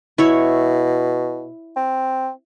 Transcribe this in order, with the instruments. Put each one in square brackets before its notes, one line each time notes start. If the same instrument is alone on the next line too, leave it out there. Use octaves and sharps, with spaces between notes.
[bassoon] B2 [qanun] E4 C#5
[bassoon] C4